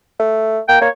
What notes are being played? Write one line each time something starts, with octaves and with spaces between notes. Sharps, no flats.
A3
A#3 G5
A#3 C#5